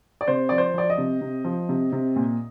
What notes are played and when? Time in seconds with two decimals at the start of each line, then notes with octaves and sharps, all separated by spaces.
0.21 D5
0.28 C3 C5
0.49 F3 D5
0.58 C5
0.74 F3 D5
0.90 D#5
0.98 C3
1.21 C3
1.44 F3
1.69 C3
1.92 C3
2.16 A#2